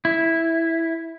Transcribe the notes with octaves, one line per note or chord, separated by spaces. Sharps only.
E4